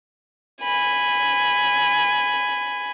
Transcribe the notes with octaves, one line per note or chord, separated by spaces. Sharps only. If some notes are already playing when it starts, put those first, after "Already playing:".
G#5 B5